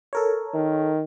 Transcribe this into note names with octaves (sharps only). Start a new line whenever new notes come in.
A4 A#4 C#5
D#3